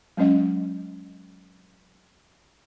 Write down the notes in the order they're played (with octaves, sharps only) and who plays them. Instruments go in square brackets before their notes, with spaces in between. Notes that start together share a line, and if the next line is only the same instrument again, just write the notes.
[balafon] F#3 G#3 C#4 D#5